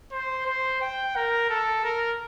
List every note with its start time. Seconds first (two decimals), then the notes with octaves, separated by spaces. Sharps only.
0.12 C5
0.46 C5
0.81 G5
1.16 A#4
1.49 A4
1.84 A#4